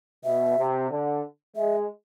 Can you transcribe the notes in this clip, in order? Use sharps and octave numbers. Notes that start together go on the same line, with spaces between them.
B2 E5
C3
D3
G#3 E5